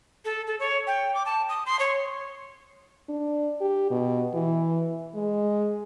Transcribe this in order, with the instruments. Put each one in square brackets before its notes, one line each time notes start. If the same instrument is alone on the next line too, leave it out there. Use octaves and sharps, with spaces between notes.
[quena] A4
A4
C#5
G5
D6
A5
D#6
C6
C#5
[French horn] D4
G4
B2
E3
G#3